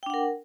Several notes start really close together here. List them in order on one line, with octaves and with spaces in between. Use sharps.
G5 D4 F#5 A#4